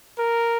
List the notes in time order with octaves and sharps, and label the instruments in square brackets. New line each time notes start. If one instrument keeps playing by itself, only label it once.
[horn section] A#4